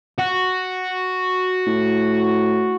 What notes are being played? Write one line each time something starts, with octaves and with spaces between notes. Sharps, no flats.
F#4
A2